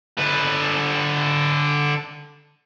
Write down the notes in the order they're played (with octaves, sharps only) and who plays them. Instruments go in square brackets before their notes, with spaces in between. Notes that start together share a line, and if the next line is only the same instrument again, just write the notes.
[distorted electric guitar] D3 B4